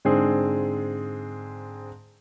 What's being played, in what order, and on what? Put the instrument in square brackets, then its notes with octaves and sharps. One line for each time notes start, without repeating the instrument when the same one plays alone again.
[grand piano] G#2 D3 G#3 C4 G#4